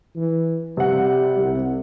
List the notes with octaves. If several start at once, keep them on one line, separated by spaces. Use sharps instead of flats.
E3
C3 G3 F#5
C2